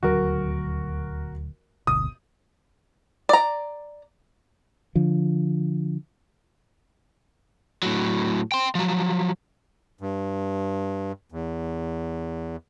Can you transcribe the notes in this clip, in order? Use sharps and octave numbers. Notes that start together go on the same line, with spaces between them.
D#1 D2 F#3 F#4 A#4
D1 G1 B2 D#6
D5 A#5
D3 F3
A2 F#3
G5 C6
F3 F#3
G2
E2